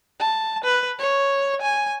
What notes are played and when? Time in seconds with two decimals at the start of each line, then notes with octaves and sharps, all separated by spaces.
0.20 A5
0.64 B4
0.99 C#5
1.62 G#5